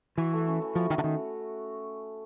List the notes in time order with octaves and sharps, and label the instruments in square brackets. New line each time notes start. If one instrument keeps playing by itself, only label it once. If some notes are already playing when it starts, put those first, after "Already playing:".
[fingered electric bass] E3 [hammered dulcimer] F#4
[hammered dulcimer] A3
C#4
E3
[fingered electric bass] F3 [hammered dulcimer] F#4
[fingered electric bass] D#3 [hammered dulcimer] A3
[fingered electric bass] D3
[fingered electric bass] D#3 [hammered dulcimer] C#4